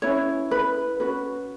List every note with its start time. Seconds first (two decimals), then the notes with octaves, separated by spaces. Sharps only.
0.02 C#4 E4 B4 C#5
0.51 B4
1.00 C#4 F#4 B4